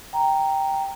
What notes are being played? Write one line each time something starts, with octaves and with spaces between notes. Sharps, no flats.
G5 A#5